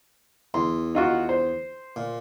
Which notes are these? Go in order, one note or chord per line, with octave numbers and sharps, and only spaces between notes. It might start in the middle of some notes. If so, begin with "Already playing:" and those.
E2 C6
D#4 F4 F#4
C5
A#2